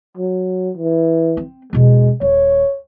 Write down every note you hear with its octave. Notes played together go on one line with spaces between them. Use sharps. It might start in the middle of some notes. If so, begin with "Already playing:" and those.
F#3
E3
C4
E2 B2 G#3
D#1 C#5